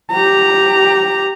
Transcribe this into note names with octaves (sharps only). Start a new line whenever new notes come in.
G4 A#5